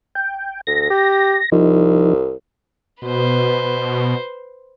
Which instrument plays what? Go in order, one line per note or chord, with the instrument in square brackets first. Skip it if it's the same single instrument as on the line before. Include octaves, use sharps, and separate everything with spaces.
[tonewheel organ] G5
[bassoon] D2 [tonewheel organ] A#6
[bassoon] G4
[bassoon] C2 [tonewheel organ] F3 D#4
[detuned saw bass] B2 [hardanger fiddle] B4 C5